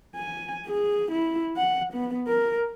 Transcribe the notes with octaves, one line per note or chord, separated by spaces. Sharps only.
G#5
G#4
E4
F#5
B3
A#4